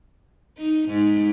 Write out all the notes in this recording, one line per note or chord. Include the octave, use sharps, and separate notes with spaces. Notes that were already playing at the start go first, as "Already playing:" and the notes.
D#4
G#2